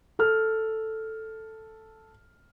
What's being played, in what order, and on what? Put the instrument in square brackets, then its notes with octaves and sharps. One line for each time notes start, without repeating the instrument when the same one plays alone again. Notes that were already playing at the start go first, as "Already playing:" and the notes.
[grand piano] A4 F6